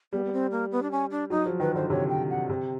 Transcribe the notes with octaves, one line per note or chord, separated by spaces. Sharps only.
G3 B3
B3
C4
A#3
B3
D4
C#4
D4
F#3 D#4
F3
D#3 B4
D3 C5
C3 C#5
G5
F#5
C3